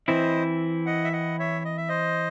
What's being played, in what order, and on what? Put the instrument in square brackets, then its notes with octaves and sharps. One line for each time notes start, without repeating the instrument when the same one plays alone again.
[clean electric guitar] E3 C4 E4 [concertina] C5 D#5
[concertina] D#5 F#5
E5
D#5 F#5
C#5 E5
D#5
E5
C5 D#5